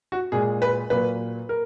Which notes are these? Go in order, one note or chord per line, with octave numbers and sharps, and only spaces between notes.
F#4
A#2 G#3 G#4
B4
A#2 F#3 A#3 B4
A#4